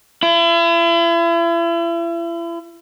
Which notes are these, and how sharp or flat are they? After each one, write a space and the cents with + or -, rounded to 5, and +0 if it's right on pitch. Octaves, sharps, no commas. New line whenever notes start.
E4 +40